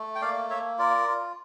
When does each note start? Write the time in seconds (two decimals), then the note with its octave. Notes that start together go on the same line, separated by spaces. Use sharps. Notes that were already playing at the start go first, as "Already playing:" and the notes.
Already playing: A3
0.15 G5
0.21 A#3 D5 F5
0.50 A#3 C#5 E5
0.79 F4 A#4 D5
1.08 F4